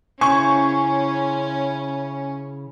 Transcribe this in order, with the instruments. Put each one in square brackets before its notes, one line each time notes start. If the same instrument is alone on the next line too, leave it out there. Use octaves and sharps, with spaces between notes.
[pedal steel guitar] C#3 E4 C5 [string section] C#4 [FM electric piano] G#5 [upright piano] C#6